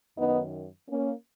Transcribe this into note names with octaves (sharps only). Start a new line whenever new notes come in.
F#2 D#3 B3 D#4
A#3 C#4